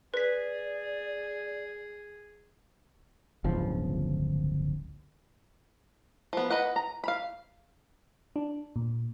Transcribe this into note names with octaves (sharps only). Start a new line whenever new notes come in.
G#4 B4 D5 B6
D1 G1 C#2 F3
F3 B3
B4 D#5 F#5
A#5
F5 B5
D4
A#2